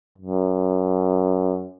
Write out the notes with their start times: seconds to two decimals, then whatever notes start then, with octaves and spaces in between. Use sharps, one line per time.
0.18 F#2